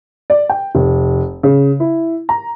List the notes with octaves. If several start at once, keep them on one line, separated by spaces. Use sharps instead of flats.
D5
G5
F1
C#3
E4
A#5